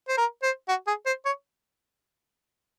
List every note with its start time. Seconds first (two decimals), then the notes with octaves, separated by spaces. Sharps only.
0.08 C5
0.17 A#4
0.43 C5
0.68 F#4
0.87 G#4
1.06 C5
1.25 C#5